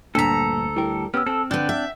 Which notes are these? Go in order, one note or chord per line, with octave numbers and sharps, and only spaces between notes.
D2 G2 A#2 D4 A4 A#5 B6
G3 E4 A#4 G5
B3 C#4 G4 E6 F6
C4 A4
D3 D4 B4 G5
E5